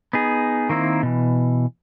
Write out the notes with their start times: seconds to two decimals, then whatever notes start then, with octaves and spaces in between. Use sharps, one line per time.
0.13 B3 D#4 G#4
0.69 D#3 A#3 C4 E4
1.03 B2 E3